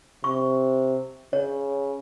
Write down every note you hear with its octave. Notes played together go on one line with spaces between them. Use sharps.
C3 C#6
C#3 C#5